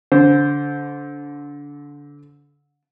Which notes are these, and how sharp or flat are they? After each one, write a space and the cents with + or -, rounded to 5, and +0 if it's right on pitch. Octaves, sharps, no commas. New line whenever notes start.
D3 -25 C5 +0